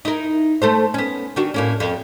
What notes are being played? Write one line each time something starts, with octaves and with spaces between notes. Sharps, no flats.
D#4 E4 A#4
A3 A4 C5
B3 C#4
D#3 D4 F#4
A2 A#3 C#4
F2